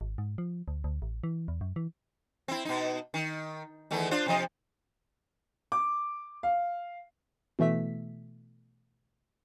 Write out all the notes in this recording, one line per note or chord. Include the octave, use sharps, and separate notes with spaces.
G#1
G#2
F3
D2
D2
A1
E3
E2
F#2
E3
C4 E4
B2 D#4
D#3
E2 D#3 A3
D4 F4 C5
C3 F3 D#5
D6
F5
B2 E3 A3 E5 B6